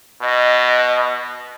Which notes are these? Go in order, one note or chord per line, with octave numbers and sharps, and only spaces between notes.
B2 D#5